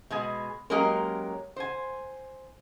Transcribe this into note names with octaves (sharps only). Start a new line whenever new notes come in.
B2 G#3 G#5
F#3 G#3 A#3 C#4 G4 A#4
C5 G#5